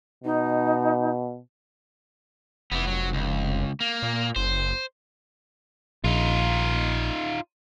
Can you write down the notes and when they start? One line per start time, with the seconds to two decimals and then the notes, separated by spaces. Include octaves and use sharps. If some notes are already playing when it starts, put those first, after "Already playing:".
0.24 B2 D#4
2.72 F1 E3 B3
2.87 F#3
3.13 C#2
3.81 A#3
4.02 A#2
4.36 F#1 C5
6.04 A#1 D#4 F4